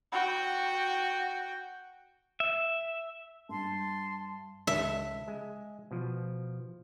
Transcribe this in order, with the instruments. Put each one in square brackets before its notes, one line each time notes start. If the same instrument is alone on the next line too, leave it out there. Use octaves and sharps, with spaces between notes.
[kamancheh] F#4 G5
[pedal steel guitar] E5
[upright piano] G2 [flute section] A5 C6
[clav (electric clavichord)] C#2 A4 [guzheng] E5
[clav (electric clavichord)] G#3
B2 F3